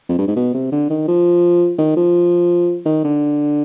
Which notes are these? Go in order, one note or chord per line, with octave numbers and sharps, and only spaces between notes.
F2
G2
G#2
B2
C3
D3
D#3
F3
D#3
F3
D#3
D3